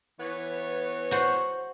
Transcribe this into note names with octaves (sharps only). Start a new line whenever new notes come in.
E3 B3 C#5
F#4 C5